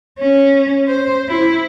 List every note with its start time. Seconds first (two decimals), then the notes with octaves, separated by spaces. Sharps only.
0.19 C#4
0.88 C5
1.29 E4